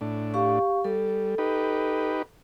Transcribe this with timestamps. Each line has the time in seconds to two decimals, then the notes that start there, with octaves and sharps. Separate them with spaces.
0.01 A2 D4
0.34 G4 F5 C#6
0.84 G3 A4
1.38 D#4 G4 B4